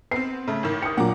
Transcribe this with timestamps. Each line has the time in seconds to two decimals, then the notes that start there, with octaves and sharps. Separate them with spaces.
0.11 B3 C4 C7
0.47 C#3 A3
0.63 A1 D#3
0.82 D#6 C#7
0.97 A#2 F#3 F#5 A#5 D6